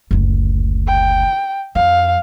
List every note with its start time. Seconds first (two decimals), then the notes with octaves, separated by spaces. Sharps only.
0.11 F#1 D2
0.87 G5
1.75 F2 F5